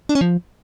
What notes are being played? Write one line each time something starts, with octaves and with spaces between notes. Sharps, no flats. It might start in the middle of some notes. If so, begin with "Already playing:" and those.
D4
C#4
F3